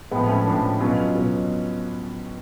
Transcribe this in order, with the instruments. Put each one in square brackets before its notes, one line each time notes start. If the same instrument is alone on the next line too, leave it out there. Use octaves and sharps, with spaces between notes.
[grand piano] A2 F3 G#3 B3
A3 C#4
A2 F3 B3 D4
B2 F#3 C#4 F4
B2 F#3